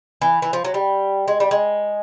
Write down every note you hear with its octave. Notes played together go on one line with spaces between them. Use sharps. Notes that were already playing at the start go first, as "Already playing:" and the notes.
E3
E3
F3
F#3
G3
G#3
G3
G#3